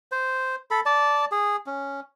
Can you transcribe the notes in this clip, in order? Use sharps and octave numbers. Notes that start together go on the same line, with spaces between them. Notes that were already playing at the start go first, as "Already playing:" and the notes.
C5
A4 B5
D5 A5
G#4
C#4